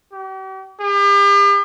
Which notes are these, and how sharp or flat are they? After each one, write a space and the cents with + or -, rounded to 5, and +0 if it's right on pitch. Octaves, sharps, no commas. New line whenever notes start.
G4 -45
G4 +40